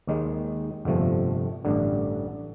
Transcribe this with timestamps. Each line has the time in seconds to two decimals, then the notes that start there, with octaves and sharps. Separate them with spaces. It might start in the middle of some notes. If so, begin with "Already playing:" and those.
0.07 D#2 D#3 G#3
0.85 G1 F2 C3 F3 A3
1.65 A1 G2 D3